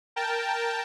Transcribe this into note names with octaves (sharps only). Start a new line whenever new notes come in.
A#4 G5 A5